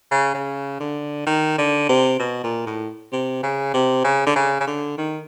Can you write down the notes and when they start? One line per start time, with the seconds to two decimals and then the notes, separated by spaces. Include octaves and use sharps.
0.11 C#3
0.34 C#3
0.80 D3
1.26 D#3
1.58 D3
1.89 C3
2.20 B2
2.43 A#2
2.66 A2
3.12 C3
3.43 C#3
3.74 C3
4.04 C#3
4.27 D3
4.36 C#3
4.60 C#3
4.67 D3
4.98 D#3